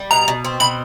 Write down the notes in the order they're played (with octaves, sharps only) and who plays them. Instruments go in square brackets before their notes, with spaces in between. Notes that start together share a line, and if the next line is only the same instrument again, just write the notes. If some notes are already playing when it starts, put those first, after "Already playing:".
Already playing: [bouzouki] G3
[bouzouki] B2 [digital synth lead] A#5
[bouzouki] B2
C4
[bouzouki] B2 [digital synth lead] B5